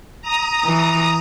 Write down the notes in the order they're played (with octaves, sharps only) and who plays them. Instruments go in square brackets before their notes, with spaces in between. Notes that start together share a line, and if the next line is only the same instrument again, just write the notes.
[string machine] A#5 D#6
[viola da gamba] E3